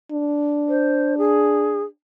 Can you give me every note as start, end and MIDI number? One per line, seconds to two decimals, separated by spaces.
0.11 1.89 62
0.68 1.18 72
1.18 1.83 68